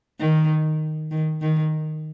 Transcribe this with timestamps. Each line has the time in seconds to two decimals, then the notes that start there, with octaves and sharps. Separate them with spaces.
0.20 D#3
1.11 D#3
1.41 D#3